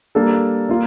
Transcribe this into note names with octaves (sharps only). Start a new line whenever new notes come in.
G3 A#3 D4 A4
A#3 F4